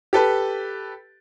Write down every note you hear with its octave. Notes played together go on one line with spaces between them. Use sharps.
G4 A4 B4